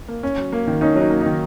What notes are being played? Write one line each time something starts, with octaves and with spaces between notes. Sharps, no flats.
A#3
C#4
F#3
A#3
D#3
C#4 D#4
F#3
D#4
A#3
D#3 D#4